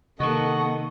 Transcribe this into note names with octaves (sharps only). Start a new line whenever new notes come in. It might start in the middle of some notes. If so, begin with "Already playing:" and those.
C3 D#3 A#3 A4 D#5 F#5 C#6